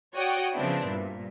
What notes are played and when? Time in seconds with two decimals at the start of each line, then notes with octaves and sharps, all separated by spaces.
0.15 F#4 C#5 D5 F#5 G5 D#6
0.54 C#3 F3 B3 C4 D4 E4
0.85 G2 A#2